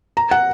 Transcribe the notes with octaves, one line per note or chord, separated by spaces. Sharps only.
A#5
F#5